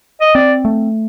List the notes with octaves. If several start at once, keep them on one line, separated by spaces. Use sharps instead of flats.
D#5
C4 D5
A3